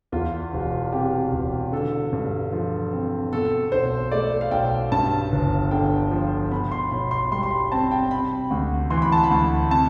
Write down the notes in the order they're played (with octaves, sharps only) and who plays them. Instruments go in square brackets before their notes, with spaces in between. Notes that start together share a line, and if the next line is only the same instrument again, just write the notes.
[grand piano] E2 F4
E1
C3 G4
E1
D3 A4
G2
F3
C4
B2 A4
B1 C5
A3 D5
F5
B1 G5
G2 A5
G1
D3 G5
F3
B2 B5
C6
B1 B5
C6
G3 C6
C6
B5
C4 A5
G5
C3 B5
D2
E3 C6
B5
A5
B5
D2
C3 A5